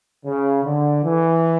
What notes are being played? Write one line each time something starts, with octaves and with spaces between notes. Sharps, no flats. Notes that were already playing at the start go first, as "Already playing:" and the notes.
C#3
D3
E3